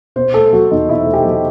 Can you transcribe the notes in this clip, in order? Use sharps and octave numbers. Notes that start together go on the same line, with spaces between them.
B2 C5
A3 A4
F#3 F#4
E2 D#4
B2 E4
A3
G4
F#3